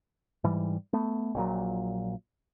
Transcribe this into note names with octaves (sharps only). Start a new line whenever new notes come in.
G#2 E3 G3
A3 B3
A#1 A#2 F#3